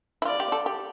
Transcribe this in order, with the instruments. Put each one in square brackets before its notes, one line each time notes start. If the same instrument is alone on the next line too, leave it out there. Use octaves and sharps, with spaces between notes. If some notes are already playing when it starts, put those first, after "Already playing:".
[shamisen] E4
[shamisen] F4 [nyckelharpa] D5
[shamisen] G4
A4
G4